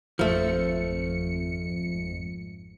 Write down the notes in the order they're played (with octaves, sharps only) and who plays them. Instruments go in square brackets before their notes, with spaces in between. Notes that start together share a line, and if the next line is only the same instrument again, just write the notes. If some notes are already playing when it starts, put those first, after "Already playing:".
[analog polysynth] G#1 F2 C#7 [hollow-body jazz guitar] F3 A3